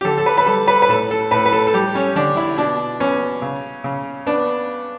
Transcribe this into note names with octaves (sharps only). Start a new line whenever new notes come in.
G4
D3 A4
A4
B4
B4
G3 A4
B4
B4
A2 A4
A4
A2 B4
B4
A4
A4
G3 G4
C#4
D3 D4
E4
B2 D4
B3 C#4
C#3
C#3
B3 D4